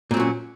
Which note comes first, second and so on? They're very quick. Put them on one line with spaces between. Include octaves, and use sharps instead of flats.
A#2 C4 F#3 C#4